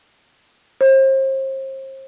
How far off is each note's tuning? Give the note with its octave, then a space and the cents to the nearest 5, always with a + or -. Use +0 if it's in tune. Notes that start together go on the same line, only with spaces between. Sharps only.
C5 +35